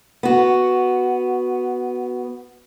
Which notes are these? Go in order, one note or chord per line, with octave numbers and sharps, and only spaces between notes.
B3 F#4